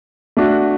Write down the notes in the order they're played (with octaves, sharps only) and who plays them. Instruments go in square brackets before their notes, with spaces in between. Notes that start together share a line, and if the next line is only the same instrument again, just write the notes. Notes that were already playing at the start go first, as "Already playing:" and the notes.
[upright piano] A3 D4 F#4